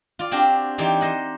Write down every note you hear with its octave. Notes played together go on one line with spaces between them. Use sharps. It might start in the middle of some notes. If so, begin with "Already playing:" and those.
F4 D5
C4 D4 F#4 G4
E3 D#4 G4 C5 D5
C5 D#5 F#5